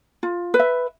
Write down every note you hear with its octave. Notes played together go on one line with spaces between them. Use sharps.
F4
B4
E5